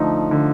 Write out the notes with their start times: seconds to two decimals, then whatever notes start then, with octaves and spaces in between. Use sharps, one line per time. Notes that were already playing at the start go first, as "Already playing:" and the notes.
Already playing: D3 F3 A3 D#4
0.31 D3